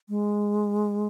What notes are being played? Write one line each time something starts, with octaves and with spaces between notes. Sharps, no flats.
G#3